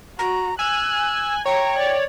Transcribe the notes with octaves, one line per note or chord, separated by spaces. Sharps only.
F#4 A#5
G#5 E6 F#6
C#5 G5 A#5
D5